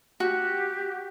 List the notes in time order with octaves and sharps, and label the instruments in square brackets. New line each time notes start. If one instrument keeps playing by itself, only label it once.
[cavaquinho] F#4 [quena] G4